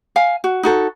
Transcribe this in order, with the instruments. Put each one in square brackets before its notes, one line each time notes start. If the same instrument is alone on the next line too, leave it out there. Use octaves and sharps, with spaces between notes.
[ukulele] F5 G#5
F#4
D#4 F#4 A4